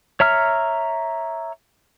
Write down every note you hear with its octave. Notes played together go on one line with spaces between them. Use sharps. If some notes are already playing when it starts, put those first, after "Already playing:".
C#5 E5 A#5 F6